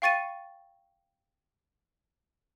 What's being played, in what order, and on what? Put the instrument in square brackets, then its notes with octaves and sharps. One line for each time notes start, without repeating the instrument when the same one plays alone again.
[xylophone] F5 G5 C#6 A6 C#7 D#7